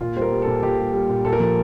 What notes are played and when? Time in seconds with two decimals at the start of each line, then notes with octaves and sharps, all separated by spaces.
0.01 A#2 F4
0.16 G3 C5
0.22 A#4
0.32 G3
0.42 A#2 A4
0.63 A#2 G4
0.78 G3
0.94 G3
1.09 A#2
1.25 A#2 A4
1.33 A#4
1.40 F3 A4